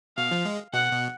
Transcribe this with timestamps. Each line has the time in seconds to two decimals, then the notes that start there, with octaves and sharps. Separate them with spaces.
0.17 B2 F5
0.31 F3
0.45 G#3
0.73 B2 F#5
0.92 B2